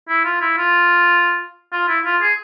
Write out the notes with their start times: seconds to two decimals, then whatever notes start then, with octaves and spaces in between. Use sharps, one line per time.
0.09 E4
0.25 F4
0.41 E4
0.58 F4
1.73 F4
1.88 E4
2.05 F4
2.22 G#4